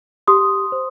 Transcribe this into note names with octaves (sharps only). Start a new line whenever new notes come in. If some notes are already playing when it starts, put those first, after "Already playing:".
G4 C6 D#6
C5